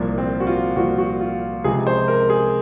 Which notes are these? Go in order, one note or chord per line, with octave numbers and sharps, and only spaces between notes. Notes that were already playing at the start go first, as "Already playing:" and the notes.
Already playing: C2 A#2 F3
C4
F#4
F4
C2 A#2 F3 F#4
F#4
F4
C#2 C3 F3 G#4
C5
A#4
G#4